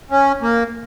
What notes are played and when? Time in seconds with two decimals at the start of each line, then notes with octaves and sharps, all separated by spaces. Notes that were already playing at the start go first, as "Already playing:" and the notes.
0.11 C#4
0.42 A#3